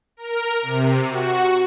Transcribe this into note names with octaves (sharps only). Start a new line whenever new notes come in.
A#4
C3
F#4